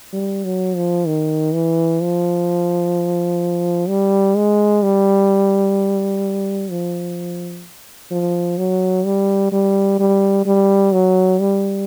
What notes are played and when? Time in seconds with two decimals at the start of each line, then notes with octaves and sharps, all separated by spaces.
0.13 G3
0.44 F#3
0.76 F3
1.07 D#3
1.54 E3
2.01 F3
3.88 G3
4.36 G#3
4.83 G3
6.70 F3
8.11 F3
8.58 F#3
9.05 G3
9.52 G3
9.99 G3
10.46 G3
10.93 F#3
11.40 G3